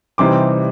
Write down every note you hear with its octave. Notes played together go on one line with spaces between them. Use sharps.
C3 E3 G3 C4 D#4 C6 D6